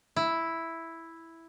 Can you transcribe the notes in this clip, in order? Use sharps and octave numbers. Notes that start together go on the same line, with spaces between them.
E4